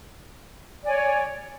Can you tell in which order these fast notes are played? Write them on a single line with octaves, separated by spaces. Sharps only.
D5 G#5 C#5